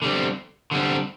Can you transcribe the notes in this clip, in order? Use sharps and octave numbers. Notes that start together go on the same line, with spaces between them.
D3 G3 C4
D3 G3 C4